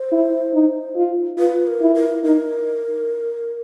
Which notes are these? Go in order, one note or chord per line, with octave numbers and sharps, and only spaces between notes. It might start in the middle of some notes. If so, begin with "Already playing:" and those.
Already playing: C5
E4
D#4
F4
F4 B4
A#4
E4
A#4
D#4 A#4